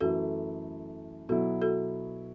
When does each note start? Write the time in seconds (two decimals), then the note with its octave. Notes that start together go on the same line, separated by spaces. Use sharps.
0.01 F#2 E3 A3 E4 F#4 A4
1.29 B2 F#3 B3 E4 F#4 A4
1.62 F#4 A4